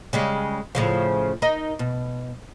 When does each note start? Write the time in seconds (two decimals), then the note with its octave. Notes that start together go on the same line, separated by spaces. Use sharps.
0.13 C#3 G3 G#3
0.75 A2 C#3 F3
1.42 D#4 A#4 D#5
1.79 B2